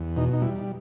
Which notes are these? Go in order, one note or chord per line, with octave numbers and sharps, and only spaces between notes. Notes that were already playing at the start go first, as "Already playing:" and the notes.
Already playing: E2
B2 D#4
D#4
G3 E4